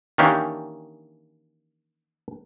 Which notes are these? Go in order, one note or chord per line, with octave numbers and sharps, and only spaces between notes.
D#3 E3 A#3 C#4 D4 G4